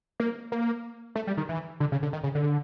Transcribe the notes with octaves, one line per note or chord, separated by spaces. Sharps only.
A#3
A#3
A3
G3
D#3
E3
D3
C#3
D3
D#3
C#3
D3